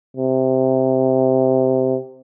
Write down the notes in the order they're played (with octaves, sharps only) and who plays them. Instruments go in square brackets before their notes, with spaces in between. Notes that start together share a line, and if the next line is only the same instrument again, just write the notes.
[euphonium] C3